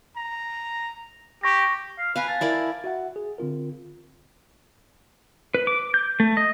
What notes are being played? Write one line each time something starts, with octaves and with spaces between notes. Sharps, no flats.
A#5
G4 C#6 A#6
F5
B4 F5 G#5 A#5
A5
E4 A#4 D5
F#4 E5 F#5
G#4
D3 C4 F4 A#4
B4
D6
G6
A3
D#5